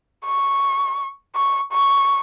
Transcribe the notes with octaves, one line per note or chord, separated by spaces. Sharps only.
C#6
C#6
C#6